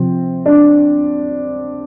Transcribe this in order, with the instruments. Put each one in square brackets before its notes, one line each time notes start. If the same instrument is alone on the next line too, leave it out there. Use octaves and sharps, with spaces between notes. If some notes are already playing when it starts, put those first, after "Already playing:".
Already playing: [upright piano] C3 F3 [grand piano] C4
[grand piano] D4